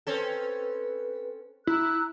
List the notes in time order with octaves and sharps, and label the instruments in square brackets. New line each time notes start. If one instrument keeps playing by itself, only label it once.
[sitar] C4 C#4 A4 [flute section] B4
[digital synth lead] E4 [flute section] A#5 E6 F#6